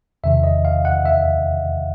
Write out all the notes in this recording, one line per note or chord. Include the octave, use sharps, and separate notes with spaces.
E2 C3 D#3 E5
D#5
F5
F#5
E5